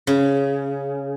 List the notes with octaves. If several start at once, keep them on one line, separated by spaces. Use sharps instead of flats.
C#3